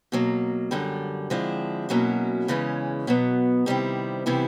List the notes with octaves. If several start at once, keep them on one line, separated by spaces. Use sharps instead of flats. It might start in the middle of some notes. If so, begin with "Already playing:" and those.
B2 F#3 A#3
F#2 D3 G3
D3 F3 G#3 C4 E4
B2 F#3 A#3 C#4 E4
E2 C#3 E3 G#3 C#4
B2 F#3 B3
C3 D#3 G3 C4 E4
C3 E3 G3 B3 E4